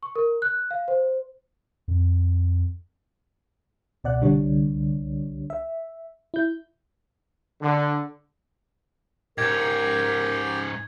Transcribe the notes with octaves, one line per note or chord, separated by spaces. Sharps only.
C#6
A#4
F#6
F5
C5
F2
C#2 B2 D5 F#5 F#6
C2 D3 G3 D4 C#5
E5
E4 G6
D3
G#2 C#4 G4 A#4 G5 G#6